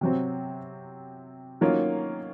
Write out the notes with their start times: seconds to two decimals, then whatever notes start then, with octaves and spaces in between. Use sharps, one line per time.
0.01 C3 F#3 C4
1.61 D#3 F#3 A#3 C#4 F4